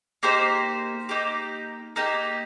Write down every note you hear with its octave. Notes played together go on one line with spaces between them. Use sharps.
A#3 D#4 G4 C5
A#3 D#4 G4
A#3 D#4 G4